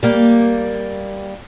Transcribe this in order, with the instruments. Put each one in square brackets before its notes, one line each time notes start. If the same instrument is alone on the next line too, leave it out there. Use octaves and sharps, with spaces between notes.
[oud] G3 A#3